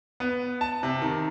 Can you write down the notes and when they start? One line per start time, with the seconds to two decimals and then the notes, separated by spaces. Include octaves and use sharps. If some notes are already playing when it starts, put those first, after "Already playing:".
0.20 B3
0.61 A5
0.83 C3
1.02 D#3